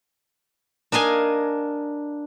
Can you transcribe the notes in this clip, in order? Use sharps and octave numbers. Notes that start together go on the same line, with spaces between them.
D4 A#4 D#5 F5 G#5